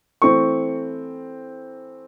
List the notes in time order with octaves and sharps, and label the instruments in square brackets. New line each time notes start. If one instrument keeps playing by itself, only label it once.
[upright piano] E3 A3 C4 C#6